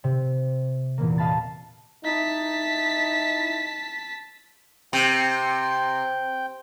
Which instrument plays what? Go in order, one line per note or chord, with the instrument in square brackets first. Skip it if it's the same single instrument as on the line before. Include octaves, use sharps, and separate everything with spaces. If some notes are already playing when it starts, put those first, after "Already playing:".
[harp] C3
E2 A#2 E3 A#3
D#5 F5 A5 B5 A6
[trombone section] D#4 E4 [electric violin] A5 B6
[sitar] C3 [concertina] G5